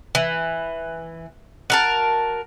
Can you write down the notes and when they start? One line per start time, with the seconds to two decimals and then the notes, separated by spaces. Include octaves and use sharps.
0.15 E3
1.70 F#4 A#4 A5